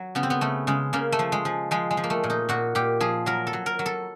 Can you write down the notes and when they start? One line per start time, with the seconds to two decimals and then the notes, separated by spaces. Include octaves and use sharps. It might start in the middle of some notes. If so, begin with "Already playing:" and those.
Already playing: F#3
0.15 C#3 B3
0.23 C4
0.30 B3
0.41 C#3 A3
0.67 C#3 G#3
0.93 C#3 A#3
1.12 A3
1.19 F3
1.32 G#3
1.45 F3
1.71 F3 G#3
1.91 G#3
1.97 F3
2.04 A#3
2.10 A3
2.24 A#2
2.30 D#4
2.49 A#2 F#4
2.75 A#2 G4
3.01 F3 G#4
3.26 F#3 A#4
3.47 A4
3.53 F#3
3.66 A#4
3.79 F#3
3.86 A4